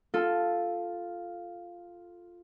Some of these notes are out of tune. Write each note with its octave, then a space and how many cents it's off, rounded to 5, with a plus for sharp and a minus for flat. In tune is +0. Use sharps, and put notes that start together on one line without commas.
F4 +0 A4 +0